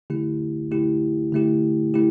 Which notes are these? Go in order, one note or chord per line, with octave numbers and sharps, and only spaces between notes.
D3 A3 E4 G4
D3 A3 E4 G4
D3 A3 E4 G4
A3 E4 G4